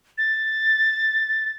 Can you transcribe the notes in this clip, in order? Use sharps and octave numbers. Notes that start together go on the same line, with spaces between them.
A6